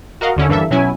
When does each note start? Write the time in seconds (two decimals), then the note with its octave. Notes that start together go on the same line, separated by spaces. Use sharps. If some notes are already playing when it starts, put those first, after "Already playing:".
0.21 F#4 A#4 D#5 F5 F#5
0.36 D#2 D3 C#4 E4
0.49 G2 E3 A#3 A4 E5
0.71 B2 F#3 C#4 E4 G#5